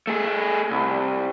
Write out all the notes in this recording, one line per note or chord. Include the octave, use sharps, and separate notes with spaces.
A3 G#4
C2